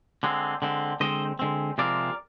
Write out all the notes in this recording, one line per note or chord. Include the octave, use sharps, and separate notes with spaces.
D3 G#3 C4
D3 G#3 C4
D3 G#3 C4 C5 D#5
D3 G#3 C4
C3 F3 G#3 C4 A#4 D5